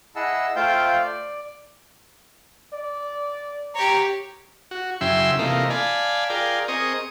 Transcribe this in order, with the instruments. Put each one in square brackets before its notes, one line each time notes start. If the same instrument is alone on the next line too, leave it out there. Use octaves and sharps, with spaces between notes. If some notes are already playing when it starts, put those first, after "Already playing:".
[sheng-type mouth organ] E4 G#4 D#5 F#5 A5 E6
A3 F4 C5 F5 G5 G6
D5
[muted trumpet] D5
[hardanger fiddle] G4 C#5 [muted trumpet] A#5
[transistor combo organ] F#4
F#2 C#3 E4 E5 G5 C6
C3 E3 A3 A#3 D#4 F4
D5 F5 G#5 A5 B5
F4 G#4 A#4 D5 G5
C4 G#4 A#4 D#5 C#6 D#6